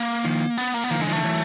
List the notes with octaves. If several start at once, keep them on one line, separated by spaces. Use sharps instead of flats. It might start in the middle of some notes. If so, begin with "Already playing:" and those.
Already playing: A#3
D#3 F3
B3
A#3
B3
D#3 F3 A#3
D3 E3 G#3
D#3 F3
D3 E3 A3
E3 F#3